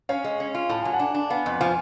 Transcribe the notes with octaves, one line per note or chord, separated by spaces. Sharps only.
C#4 C#5 F5
G#3
C#4
F4
A2 A5
F#3 G#5
F#5 A5
D4
D4
B3 F5 G#5
F2
F3 F5 G#5